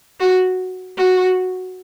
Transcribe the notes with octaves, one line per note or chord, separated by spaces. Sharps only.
F#4
F#4